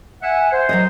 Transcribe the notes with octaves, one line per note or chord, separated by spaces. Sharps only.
E5 F#5 G#5
C5
F#3 C#5 D#5